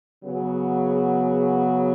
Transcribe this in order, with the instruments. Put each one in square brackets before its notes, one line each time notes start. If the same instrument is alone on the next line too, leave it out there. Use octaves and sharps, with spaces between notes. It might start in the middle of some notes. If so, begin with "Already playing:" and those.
[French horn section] C#3 F#3 B3 G#4